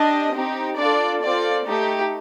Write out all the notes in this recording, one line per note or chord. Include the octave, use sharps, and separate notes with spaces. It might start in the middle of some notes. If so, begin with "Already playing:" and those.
Already playing: D4 G4 D#5
C4 D#4 G4
D4 F4 A4 D5
C4 F4 A4 D5
A3 D#4 G4